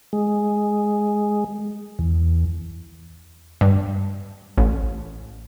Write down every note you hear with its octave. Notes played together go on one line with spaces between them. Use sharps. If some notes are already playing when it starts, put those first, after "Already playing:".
G#3
E2
G2
A1